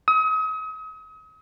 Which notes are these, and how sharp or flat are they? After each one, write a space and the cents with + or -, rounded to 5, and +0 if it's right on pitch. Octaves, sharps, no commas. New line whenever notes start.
D#6 +40